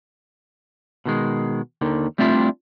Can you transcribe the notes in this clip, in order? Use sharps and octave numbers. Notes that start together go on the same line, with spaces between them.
B2 D#3 G#3
D#2 D3 D#3
G3 A3 C4 D4 E4 F4